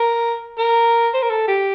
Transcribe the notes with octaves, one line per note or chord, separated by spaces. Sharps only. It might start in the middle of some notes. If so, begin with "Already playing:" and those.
Already playing: A#4
A#4
C5
A#4
A4
G4